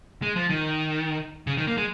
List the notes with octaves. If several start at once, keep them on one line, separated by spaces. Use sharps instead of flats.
G#3
F3
D#3
C#3
D#3
A#3
G#3